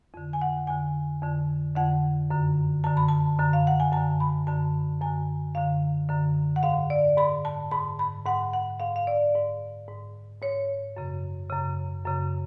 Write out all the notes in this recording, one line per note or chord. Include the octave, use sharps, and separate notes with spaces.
F2 D3
G#5
F#5
F2 D3 G#5
F2 D3
F2 D3 F#5
F#2 D3
F#2 D3 A5
B5
A5
F#2 D3
F5
F#5
G#5
F#2 D3 A5
B5
F#2 D3 A5
F#2 D3 G#5
F#2 D3 F5
F#2 D3
F#5
G#2 F5
D5
G#2 B5
A5
G#2 B5
B5
G#2 F#5
F#5
G#2 F5
F5
D5
G#2
G#2
G#2 C#5
F#2 C#3
F#2 C#3
F#2 C#3